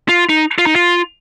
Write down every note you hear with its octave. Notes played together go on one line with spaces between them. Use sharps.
F4
D#4
F4
D#4
F4